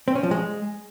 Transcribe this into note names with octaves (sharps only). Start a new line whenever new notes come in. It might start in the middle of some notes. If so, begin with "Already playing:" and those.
C4
C#4
F3
G#3